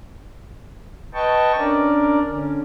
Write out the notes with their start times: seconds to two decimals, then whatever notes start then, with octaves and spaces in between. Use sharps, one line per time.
1.14 B4 D#5 G5 A5 C#6
1.58 C#4 D4 A#4 D5
2.27 D3 C#4